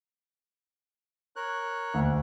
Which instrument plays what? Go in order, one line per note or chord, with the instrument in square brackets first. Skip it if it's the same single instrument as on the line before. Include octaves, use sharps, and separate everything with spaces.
[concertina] A#4 C#5 F#6
[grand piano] D2